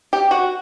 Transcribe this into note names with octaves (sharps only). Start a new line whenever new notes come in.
G4
F#4